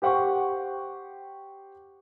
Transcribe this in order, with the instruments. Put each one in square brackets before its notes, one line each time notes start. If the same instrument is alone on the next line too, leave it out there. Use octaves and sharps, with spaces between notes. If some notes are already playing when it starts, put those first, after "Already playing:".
[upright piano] G4 C5 F#5 G5 C#6